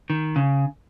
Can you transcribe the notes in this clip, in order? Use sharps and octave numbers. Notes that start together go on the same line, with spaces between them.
D#3
C#3